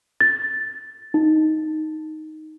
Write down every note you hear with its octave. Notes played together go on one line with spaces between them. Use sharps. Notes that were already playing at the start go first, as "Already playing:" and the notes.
A6
D#4